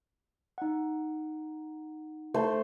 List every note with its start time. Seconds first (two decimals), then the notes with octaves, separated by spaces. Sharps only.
0.58 D#4 F#5
2.34 A3 C5